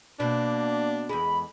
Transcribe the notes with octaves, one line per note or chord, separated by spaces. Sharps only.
B2 A#3 D4
E2 G#3 B5